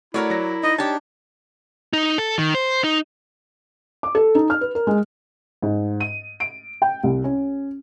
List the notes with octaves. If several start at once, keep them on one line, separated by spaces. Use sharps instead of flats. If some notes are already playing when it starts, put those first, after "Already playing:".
A3 E4 F#4 A#4 C#5 D5
F#3 A#6
D#4 D#5
D4 G4 C#5 A5
D#4
A4
D#3
C5
D#4
D6
A4
D#4
F6
B4
A#4
G#3
G#2
D#7
D7
G5
C2
C#4